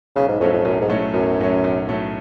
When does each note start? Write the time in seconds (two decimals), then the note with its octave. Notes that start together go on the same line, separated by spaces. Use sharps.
0.15 B1 C#3
0.28 G#2
0.40 F2 A2 F#3 A3 C#4
0.53 F2
0.65 B1 F#2
0.81 G#2
0.89 A2 F#3 A3 C#4
1.14 B1 F#2
1.39 A2 F#3 A3 C#4
1.64 B1
1.88 A2 F#3 A3 C#4